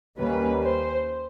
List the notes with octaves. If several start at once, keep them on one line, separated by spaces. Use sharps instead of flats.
D#2 D#3 G3 A#3 C#4 B4
C5